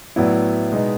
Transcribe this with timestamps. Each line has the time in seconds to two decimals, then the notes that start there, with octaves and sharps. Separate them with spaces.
0.16 A2 F#3 B3 E4 D5
0.72 B2 G#3 B3 D#4